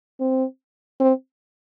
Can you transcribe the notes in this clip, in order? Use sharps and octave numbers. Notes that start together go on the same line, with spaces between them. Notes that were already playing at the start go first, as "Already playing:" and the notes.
C4
C4